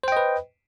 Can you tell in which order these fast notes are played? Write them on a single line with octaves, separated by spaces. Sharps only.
C5 G5 D#5 B4